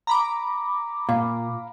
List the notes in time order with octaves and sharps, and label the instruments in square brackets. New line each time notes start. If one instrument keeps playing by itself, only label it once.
[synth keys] A#5 B5 D6
[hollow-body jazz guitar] A#2 [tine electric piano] F5